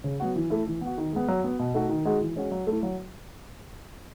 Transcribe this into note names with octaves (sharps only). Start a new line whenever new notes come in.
C#3
F#3 B3 F#4
E3
A3 E4
E3
B3
F#4
D#3
G#3 B3
F#3
B3 F#4
B2
A3 D#4 F#4
D#3
G#3 D#4 F#4
E3
G#3 C#4 F#4
F#3
A3
E4
F#3